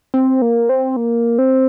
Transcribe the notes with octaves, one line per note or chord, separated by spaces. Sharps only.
C4
A#3
C4
A#3
C4